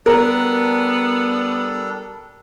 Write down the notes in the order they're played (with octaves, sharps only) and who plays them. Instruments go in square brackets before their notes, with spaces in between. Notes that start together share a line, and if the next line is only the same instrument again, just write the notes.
[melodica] G3 D4 A4 [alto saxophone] B3 [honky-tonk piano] A#4